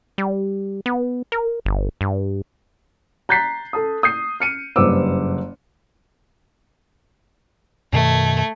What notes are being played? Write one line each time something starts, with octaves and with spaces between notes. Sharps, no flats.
G3
B3
A#4
G1
G2
A#5 F#6 G6 A6 B6 C7
A4 A5 D#6
D#6 G6 C7
F6 C#7 D#7
F#1 G2 B4 C5 D6 E6
F#2 B2 D#3 A3 G#6